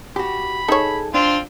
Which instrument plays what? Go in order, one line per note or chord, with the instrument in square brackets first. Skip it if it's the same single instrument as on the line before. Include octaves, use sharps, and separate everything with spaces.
[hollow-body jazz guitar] F#4 G4 [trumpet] B5
[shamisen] D#4 C#5 [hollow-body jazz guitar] G#4 A4
[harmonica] C4 F4 [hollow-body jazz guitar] D4